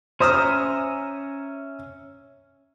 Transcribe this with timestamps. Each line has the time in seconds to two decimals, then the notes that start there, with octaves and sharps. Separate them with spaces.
0.20 C#4 C5 E5 A#5 D#6 F6